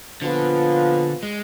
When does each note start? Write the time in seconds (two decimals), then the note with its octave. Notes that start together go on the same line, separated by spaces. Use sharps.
0.22 A#2 D3 F3 B3 F4
1.23 G#3